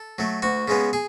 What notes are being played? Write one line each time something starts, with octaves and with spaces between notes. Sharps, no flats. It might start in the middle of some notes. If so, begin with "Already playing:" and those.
Already playing: A4
F#3 A3
D2 F#4
C#3 G#3 B3
G#4